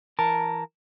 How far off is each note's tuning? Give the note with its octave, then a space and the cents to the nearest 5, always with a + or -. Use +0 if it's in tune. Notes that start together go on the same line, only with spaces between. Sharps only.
E3 +5 A#4 +0 A5 +5